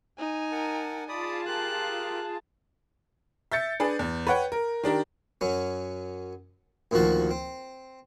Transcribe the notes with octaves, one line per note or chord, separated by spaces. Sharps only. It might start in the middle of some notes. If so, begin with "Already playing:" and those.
D#4 G#5
A#4 F#5 A5
F4 G#4 D5 A5 B5 D#6
G4 A#4 F5 F#6
E5 G6 A6 C#7
D4 G#4 B4
E2
B4 C#5 F#5 G5
A#4
D#3 D4 G4 A#4
F#2 F#3 C#4
D2 A#2 D#3 F3 F#4 A5
C4